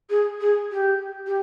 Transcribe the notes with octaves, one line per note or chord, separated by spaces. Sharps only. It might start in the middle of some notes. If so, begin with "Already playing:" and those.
G#4
G#4
G4
G4